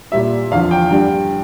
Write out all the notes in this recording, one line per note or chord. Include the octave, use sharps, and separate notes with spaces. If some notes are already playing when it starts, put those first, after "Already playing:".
A#2 G3 E5
E2 D3 F3 F5
G5
G2 D3 G3